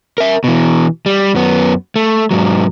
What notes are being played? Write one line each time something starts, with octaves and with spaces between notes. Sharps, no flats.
A#4 E5
B2 E3
G3
F#2 B3
A3
G#2 F#3